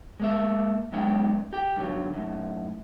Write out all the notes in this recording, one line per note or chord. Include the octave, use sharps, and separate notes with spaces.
G#3 A#3 E5
G2 F#3 G#3 B3 C#4 G5
G4 G5
G2 D3 F3 F#3
F#2 A2